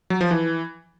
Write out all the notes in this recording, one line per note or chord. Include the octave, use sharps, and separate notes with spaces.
F#3
F3
E3